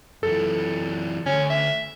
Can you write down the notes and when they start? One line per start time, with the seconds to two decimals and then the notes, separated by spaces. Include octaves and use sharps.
0.23 F#2 E3 A4
1.26 D2 C#4
1.50 E5